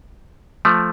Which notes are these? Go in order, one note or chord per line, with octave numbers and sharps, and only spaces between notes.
F3 A3